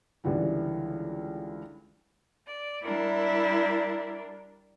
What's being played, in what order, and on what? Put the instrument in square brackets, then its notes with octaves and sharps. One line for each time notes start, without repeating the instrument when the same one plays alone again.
[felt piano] C#2 D3 E3 G3
[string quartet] D5
[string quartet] G3 D4 A#4 [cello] E4